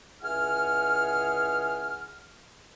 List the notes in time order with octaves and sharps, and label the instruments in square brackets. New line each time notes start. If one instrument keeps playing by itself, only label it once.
[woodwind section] C#2 E4 G#4 F#5 G#5 F6